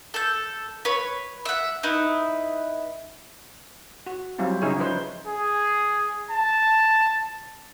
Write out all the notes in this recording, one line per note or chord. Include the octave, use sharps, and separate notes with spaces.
A4 G6
B4 C#5
E5 F#5
D#4 E4 B4
F#4
F#3 G3 C4 E4 F4
C#3 D#4 E4 G#4 C#5
F3 D#4 B4 C5
G#4
A5